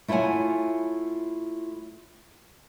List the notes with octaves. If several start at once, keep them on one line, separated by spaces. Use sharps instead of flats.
A3 E4 F4 C#5 F#5 G#5